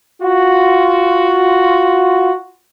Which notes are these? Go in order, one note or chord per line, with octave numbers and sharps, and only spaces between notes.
F4 F#4